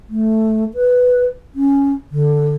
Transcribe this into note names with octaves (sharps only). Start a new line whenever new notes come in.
A3
B4
C#4
D3